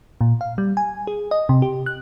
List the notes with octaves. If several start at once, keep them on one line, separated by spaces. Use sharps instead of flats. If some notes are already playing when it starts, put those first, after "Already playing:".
A#2
F5
G3
G#5
G#4
D#5
C3
G4
F#6